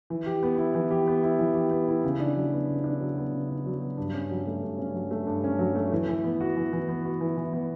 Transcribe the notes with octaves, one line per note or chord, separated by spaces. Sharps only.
E3
G4
B3
E4
E3
G4
B3
E4
E3
G4
B3
E4
C#3
D4
F#3
B3
C#3
D4
F#3
B3
C#3
D4
F#3
B3
G2
C#4
F#3
A3
G2
C#4
F#3
A3
G2
C#4
F#3
A3
E3
E3
B3
F#4
E3
E3
B3
F#4
E3
E3
B3